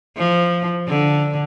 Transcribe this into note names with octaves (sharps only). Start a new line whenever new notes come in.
F3
D3